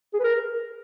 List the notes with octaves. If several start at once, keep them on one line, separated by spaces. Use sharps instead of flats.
G#4
B4
A#4